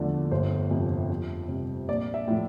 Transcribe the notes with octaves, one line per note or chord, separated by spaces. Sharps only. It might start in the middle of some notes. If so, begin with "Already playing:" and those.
Already playing: E2 D3 F3 A3 D5
G1 C5
F2 C3
F2
C3 G3
A#1 D5
E5
A2 F3 A3